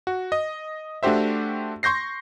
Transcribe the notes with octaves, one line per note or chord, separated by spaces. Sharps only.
F#4
D#5
A3 D4 F#4 G4 C5 E5
C6 C#6 G6 A#6 C7